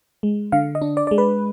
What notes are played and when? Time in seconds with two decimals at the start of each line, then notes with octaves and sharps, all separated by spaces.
0.23 G#3
0.52 D3 F5
0.75 D#5
0.82 D4
0.97 D5
1.07 G#3 D5
1.18 B4